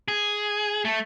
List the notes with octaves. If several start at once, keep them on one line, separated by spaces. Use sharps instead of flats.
G#4
A3